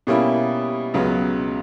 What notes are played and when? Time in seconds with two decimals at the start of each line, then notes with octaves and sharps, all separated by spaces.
0.07 B2 G3 A#3 C#4 E4
0.94 C#2 C#3 F#3 B3